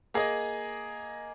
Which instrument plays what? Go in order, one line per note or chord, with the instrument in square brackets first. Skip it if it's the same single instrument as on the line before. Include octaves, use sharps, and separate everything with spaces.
[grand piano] A#3 G#4 D#5